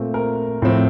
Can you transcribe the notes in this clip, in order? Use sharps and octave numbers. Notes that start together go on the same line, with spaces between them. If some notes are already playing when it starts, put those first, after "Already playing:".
Already playing: A#2 A3 C4
A#4
A2 F3 C4